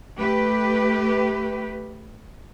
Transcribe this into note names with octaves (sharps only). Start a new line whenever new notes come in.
A3 G4 B4